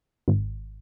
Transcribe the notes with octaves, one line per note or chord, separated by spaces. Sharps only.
G#1